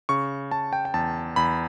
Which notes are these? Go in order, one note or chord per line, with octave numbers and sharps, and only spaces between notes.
C#3 C#6
C#3 A5
G5
G5
E2 A5
E2 B5